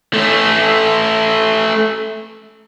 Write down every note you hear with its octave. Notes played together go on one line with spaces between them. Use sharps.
A3 C#4